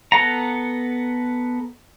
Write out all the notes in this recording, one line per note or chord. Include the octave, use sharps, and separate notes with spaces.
B3 A4 F#5 A#5